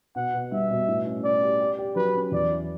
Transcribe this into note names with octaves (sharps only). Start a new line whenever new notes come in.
B2 F#5
B2
G3 E5
B2
A2
C#4
C#4 D5
G4
G4
G4
F#3 B4
C#4
E2 D5
E4